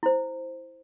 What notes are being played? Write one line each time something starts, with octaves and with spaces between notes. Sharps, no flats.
E4 C5